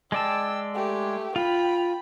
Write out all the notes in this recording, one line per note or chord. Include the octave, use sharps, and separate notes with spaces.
G#3 D5 G5 A5 E6
A3 G4
F4 G5 B5